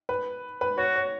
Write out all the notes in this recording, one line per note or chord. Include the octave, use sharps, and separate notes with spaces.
B4
B4
F#4 C#5
C#5